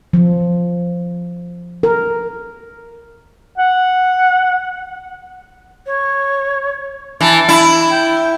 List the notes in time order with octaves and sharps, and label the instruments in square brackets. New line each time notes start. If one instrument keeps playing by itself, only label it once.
[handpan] F3
A#4
[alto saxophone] F#5
[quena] C#5
[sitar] E3 [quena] A5
[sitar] E4
[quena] G5